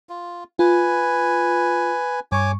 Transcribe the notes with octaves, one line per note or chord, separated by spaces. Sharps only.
F4
F4 B4 G#5
G2 C#5 G#5 C#6 D6